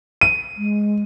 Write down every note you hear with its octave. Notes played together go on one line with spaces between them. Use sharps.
D#7
G#3